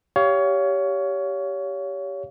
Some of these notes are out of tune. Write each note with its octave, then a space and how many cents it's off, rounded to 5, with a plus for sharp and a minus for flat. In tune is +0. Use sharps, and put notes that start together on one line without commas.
G4 +0 C#5 +25 F5 -5